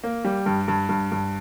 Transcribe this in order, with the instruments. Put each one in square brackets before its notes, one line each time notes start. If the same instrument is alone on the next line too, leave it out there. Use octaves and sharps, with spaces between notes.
[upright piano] A#3
G3
G2
G2
G2
G2